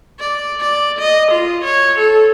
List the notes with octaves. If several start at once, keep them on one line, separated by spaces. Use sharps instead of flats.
D5
D5
D#5
F4
C#5
A4